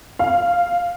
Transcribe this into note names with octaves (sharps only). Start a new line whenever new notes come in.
F5